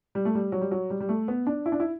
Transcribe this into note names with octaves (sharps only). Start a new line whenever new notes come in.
G3
A3
G3
F#3
G3
F#3
G3
G3
A3
B3
D4
E4
D4
E4